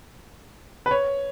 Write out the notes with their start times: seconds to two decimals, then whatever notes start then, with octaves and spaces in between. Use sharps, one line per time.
0.86 B4
0.91 C#5